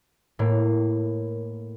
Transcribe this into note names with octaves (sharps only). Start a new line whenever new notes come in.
A2 A#3